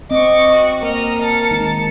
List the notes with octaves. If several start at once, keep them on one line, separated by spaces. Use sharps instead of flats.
C4 D#5 C#6 D6
F#4
A#3 A#4 D#5 F6
A5 C#7
D#3 G#3 D#4